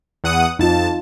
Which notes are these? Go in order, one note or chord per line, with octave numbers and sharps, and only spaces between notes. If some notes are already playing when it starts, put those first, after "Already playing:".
E2 F#5 D#6
F2 D#4 F4 A5